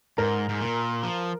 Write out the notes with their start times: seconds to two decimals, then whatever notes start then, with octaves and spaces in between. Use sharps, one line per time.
0.18 G#2 A#4 A#5
0.49 G#2
0.61 A#2
1.03 F3